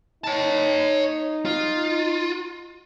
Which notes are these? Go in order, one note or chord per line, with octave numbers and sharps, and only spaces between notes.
D#4 C#5 A5
F4